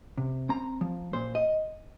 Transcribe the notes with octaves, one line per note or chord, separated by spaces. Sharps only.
C3
C4 A#5
F3
A#2 C5
D#5